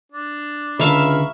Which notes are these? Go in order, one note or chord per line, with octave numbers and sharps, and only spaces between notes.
D4
C#2 D3 A#4 E5 F5 B5 C#6